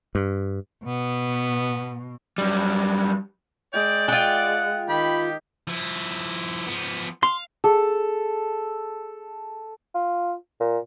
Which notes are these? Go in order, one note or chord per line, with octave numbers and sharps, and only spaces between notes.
G2
B2 B3
F#2 G3
G#3 D5 G5
F4 F#5 G5
D#3 G4 B5
F3 E4
F3 B3
F5 C6
G#4 A4
F4
A#2